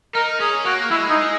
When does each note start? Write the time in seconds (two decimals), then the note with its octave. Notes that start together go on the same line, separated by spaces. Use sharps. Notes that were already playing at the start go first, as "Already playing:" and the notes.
0.15 D#4 A#4
0.40 C#4 G#4
0.65 A#3 F#4
0.91 G#3 E4
1.10 D#4